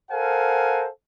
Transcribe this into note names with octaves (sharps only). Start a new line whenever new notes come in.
A4 A#4 C5 F5 F#5 G#5